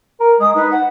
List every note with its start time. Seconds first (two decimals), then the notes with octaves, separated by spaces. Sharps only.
0.20 A#4
0.40 G#3 D#6
0.55 D#4 B4
0.70 F#5